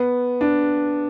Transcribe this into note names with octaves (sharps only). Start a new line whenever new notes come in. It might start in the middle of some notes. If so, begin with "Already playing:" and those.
Already playing: B3
D4